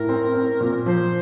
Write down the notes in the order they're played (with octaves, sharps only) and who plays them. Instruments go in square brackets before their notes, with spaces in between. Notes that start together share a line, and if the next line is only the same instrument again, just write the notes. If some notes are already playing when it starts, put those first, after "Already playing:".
Already playing: [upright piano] A2 [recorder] A#4
[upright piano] C4
C4
A#2
[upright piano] F3 [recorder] C5